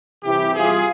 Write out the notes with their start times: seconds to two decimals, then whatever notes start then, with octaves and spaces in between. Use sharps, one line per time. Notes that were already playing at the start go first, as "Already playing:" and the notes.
0.23 C2 C3 E3 E4 G4
0.54 E2 C3 G3 F4 G#4